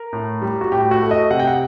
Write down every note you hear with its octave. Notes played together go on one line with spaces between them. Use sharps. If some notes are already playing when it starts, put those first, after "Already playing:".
Already playing: A#4
A2
G3
F#4
A2 G4
F#4
A3
D#5
C3 F#5
G5
F#5